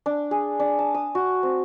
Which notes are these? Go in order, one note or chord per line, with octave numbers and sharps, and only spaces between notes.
D4
G#4
D4
A5
D#6
F#4
C4